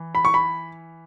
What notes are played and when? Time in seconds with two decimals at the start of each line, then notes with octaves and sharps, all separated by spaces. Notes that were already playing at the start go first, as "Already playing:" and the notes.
Already playing: E3
0.15 B5
0.25 C#6
0.34 B5